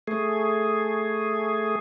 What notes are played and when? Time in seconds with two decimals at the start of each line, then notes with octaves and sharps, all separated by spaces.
0.08 A3 G#4